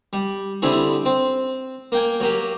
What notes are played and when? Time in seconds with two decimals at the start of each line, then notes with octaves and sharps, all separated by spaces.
0.13 G3
0.62 D3 G3 C4 E4 G#4
1.05 C4
1.92 A#3 G5 G#5
2.20 F#3 A#3 G4